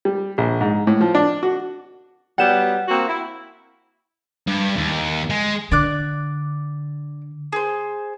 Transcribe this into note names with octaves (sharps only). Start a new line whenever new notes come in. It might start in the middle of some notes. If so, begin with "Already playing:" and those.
G3
A#1
G#2
A2
F3
D4
F#4
F#3 G3 B3 F#5 E7
A#3 C4 F#4
E4
G2
D#2
G#3
D3 D5 D6 F#6
G#4 C5